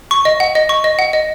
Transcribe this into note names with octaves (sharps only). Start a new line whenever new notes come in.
C#6
D#5
F#5
D#5
C#6
D#5
F#5
D#5